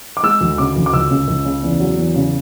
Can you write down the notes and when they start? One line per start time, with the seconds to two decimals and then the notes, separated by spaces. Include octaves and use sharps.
0.17 D6
0.23 G#3 E6
0.41 D2
0.58 C#3 D6
0.76 D2
0.86 D6
0.93 C#2 E6
1.11 C#3
1.28 C#2
1.45 C#3
1.63 E2
1.80 F#3
1.98 E2
2.16 C#3